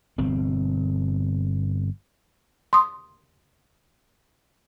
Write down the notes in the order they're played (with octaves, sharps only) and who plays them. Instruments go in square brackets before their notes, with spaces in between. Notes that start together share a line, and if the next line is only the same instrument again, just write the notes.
[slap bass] G1 B2 C4
[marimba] C6 D#6